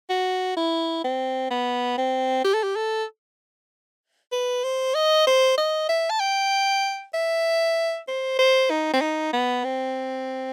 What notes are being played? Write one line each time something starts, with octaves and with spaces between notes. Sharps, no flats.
F#4
E4
C4
B3
C4
G4
A4
G4
A4
B4
C5
D#5
C5
D#5
E5
A5
G5
E5
C5
C5
D#4
C4
D#4
B3
C4